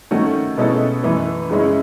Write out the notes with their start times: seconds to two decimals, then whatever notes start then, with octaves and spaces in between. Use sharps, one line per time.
0.11 D#3 A3 C#4 F#4 A4
0.57 B2 G#3 C#4 E4 A4
1.04 F#2 E3 A3 E4 B4
1.49 F#2 C#3 G#3 C#4 E4